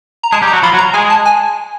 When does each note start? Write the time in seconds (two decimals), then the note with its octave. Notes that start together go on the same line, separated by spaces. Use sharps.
0.23 A#5
0.32 G#3 G#4 A5
0.42 G3 G4
0.47 A#5
0.53 F#3 F#4
0.63 F3 F4 B5
0.73 F#3 F#4
0.78 A#5
0.94 G#3 G#4 G#5
1.10 A5
1.25 G#5